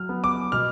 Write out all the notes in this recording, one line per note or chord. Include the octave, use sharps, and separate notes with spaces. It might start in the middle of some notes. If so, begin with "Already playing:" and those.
Already playing: F#3 F6
B3
D6
B2 F6